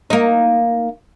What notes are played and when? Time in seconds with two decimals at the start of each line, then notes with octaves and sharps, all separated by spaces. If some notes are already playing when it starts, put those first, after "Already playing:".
0.10 A#3 D#4